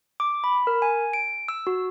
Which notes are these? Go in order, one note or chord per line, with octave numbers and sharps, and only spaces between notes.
D6
B5
A#4
G#5
D7
E6
F#4